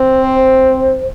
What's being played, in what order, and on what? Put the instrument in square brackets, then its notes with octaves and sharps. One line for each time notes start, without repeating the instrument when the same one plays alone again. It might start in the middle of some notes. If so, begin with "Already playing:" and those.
Already playing: [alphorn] C4
[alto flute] C5